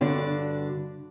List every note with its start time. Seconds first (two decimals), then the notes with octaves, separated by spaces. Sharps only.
0.01 G2 D3 D4 F#4 D5